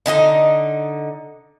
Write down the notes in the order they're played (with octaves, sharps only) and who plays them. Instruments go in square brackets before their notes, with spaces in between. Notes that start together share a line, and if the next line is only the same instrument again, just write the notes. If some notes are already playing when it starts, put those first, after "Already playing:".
[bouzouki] D3 D#4 F#4 D#5